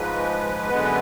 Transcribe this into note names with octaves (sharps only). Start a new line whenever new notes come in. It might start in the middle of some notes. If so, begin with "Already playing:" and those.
Already playing: G#2 F3 G#3 B4
F#2 D3 G#3 B3